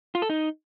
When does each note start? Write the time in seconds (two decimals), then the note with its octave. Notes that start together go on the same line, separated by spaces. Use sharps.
0.15 F4
0.22 A4
0.30 D#4